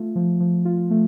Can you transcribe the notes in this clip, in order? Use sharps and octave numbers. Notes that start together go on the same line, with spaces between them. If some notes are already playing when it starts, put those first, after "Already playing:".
Already playing: A3 F4
F3
F3
F4
A3